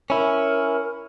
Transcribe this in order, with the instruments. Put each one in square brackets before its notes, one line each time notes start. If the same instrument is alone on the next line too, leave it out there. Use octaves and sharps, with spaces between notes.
[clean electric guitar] C#4 E4 [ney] A#4